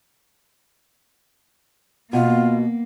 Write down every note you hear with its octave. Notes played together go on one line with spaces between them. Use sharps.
B2 A#3 F4